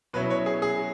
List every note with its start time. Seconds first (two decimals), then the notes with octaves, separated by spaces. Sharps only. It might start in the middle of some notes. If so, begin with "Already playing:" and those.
0.13 B2 F#3 C#4 E4 B4
0.30 C#5
0.46 G#4
0.62 G#4